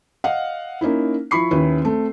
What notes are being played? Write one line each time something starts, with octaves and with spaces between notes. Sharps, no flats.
D#5 F5 F#5
A#3 C#4 D#4 E4
F3 E4 B5 C#6 C7
D#2 C#4 E4 B4
A3 C4